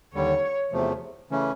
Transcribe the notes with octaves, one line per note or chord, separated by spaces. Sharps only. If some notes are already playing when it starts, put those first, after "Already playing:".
D#2 D3 G3 C#5
E2 C3 F3 A3
C#3 E3 A3 C#4